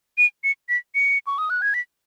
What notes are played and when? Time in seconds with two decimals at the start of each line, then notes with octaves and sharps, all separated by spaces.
0.18 D#7
0.44 C#7
0.69 B6
0.95 C#7
1.27 C#6
1.38 D#6
1.50 F#6
1.62 G#6
1.74 B6